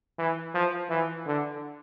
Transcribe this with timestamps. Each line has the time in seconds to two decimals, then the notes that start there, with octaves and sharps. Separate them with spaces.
0.18 E3
0.54 F3
0.90 E3
1.26 D3